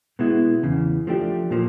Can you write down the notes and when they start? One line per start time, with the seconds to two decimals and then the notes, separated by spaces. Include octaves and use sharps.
0.19 B2 G#3 B3 E4
0.63 E2 C#3 E3
1.07 F3 A3 D4 G4
1.51 A#2 F3 A#3